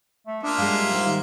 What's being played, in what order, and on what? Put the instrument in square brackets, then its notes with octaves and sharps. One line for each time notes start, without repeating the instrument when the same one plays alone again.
[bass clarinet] A3
[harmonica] A#3 F4 E5 [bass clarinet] D4 [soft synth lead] D#6
[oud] F#3 G#3 G4 [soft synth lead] F5
[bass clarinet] G#2 [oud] F#3 G#3 G4
[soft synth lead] D#3